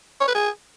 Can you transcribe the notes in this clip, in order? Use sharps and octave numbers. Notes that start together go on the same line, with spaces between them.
C#5
B4
G#4